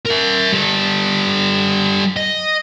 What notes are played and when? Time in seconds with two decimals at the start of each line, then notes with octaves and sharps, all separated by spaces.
0.06 A#4 E5
0.53 G3 A4
2.17 D#5